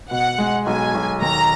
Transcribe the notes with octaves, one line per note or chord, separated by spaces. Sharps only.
B2 F#5
G#3
B1 G#5
B1
D#2 A#5